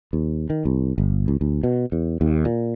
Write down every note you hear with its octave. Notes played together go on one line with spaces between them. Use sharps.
D#2
D#3
C2
G1
C#2
D2
B2
E2
D#2
A#2